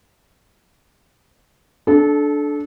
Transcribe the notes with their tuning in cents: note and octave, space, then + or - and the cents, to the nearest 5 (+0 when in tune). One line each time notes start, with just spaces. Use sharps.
D4 +0 A4 -25